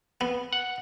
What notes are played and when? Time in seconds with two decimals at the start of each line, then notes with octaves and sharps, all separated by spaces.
0.21 B3
0.53 F#5